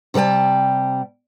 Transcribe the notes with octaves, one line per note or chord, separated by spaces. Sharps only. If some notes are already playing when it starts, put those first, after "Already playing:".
C3 G3 A4 G5 A5